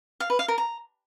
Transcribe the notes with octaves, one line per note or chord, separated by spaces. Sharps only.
F5
B4
F5
A#4
A#5